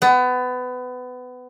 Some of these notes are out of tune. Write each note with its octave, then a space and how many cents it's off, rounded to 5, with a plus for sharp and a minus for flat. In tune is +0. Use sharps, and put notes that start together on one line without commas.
B3 +25